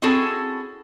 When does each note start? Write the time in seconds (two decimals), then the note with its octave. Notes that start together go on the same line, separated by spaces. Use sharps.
0.02 C4 C#4 E4 F#4 G#4 A4